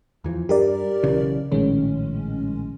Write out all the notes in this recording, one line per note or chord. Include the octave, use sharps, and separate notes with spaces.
E2 E3 F3
G2 G4 A#4 D5
B1 C#3 E3
A#1 A2 D#3 G#3 C#4